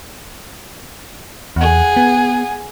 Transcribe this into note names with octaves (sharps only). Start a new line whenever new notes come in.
E2 G#4 F#5
B3